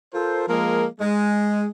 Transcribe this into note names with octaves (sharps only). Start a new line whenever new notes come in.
F4 A4 A#4 C5
F3 G#3 A#3 G#4 A#4
G#3